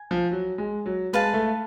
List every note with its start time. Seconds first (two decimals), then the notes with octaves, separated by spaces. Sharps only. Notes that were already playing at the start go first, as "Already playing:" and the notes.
Already playing: G#5
0.11 F3
0.31 F#3
0.58 G#3
0.86 F#3
1.13 G#3 B4 F5 A5
1.34 A3